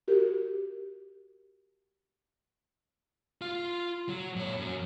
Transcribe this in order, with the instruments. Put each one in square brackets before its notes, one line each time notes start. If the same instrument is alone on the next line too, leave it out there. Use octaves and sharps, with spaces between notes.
[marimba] F#4 G4 A#4
[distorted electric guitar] F4 F5
F#3
A#2 C#5
F#2